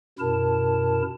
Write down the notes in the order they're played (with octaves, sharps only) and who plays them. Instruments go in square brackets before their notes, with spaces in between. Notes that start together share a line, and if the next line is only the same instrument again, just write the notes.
[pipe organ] F#2 B2 E4 A#4 A5